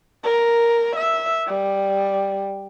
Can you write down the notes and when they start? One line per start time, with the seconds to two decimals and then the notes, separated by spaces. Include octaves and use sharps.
0.24 A#4
0.96 E5
1.47 G3